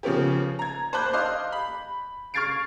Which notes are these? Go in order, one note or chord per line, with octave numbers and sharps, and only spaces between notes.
C#3 F3 B3 C#4 G4
A#5 G#6
C5 A5 B5 D6 F#6 G6
D#5 F5 C6 D6
B5
C#6 F6 G#6 A6 C7 D7